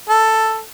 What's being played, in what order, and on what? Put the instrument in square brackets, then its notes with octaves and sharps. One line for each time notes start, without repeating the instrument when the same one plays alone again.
[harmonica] A4